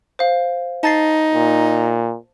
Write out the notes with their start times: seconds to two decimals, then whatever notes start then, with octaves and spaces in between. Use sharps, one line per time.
0.19 C5 F5
0.83 D#4 A5 A6 C7
1.34 A#2